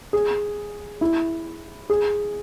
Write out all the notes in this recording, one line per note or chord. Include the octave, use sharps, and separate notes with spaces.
G#4
E4
G#4